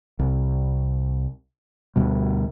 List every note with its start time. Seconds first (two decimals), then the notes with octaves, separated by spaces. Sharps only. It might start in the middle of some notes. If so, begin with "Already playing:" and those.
0.19 C2
1.96 D2 B2 G3